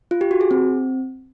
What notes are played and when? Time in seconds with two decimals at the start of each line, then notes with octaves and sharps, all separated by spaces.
0.11 F4
0.21 G4
0.31 F#4
0.41 G#4
0.51 C4